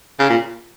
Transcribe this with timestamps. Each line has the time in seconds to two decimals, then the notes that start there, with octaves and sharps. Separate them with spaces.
0.20 C#3
0.30 A#2